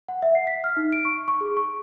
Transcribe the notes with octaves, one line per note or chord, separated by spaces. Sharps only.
F#5
E5
C7
B6
F6
D#4
D7
C#6
C#6
G#4
C#6